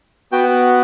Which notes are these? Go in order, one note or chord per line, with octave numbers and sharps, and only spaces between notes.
B3 F#4 G5